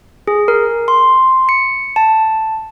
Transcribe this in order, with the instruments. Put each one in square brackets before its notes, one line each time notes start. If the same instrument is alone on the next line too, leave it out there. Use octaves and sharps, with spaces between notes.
[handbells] G#4
A#4
C6
C#7
A5